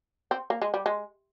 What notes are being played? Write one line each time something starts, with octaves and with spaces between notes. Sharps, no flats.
C4
A#3
G#3
G3
G#3